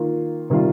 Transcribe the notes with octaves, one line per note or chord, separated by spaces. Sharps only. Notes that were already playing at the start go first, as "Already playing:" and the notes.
Already playing: D#3 A#3 F4
C3 D#3 G3 A#3 F4